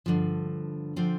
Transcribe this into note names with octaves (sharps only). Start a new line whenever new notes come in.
G2 D3 F3
D3 F3 C4